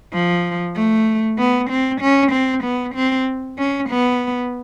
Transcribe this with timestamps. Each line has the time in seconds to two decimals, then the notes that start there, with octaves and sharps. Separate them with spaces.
0.12 F3
0.75 A3
1.38 B3
1.70 C4
2.01 C#4
2.32 C4
2.64 B3
2.95 C4
3.58 C#4
3.89 B3